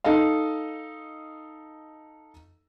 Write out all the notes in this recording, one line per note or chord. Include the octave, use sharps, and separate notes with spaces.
D#4 A4 D#5 F5